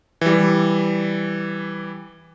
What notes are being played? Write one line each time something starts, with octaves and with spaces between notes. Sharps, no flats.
E3 G3